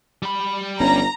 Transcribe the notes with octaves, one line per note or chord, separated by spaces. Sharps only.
G3 B5
G1 C#4 A#5